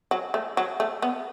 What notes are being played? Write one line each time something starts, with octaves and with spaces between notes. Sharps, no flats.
F#3
A3
F#3
A3
B3